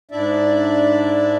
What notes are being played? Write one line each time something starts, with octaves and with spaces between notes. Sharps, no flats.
G#2 D4 E4 D5 E5